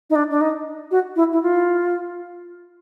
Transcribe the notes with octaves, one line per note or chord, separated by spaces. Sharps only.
D#4
D4
D4
D#4
F#4
E4
E4
F4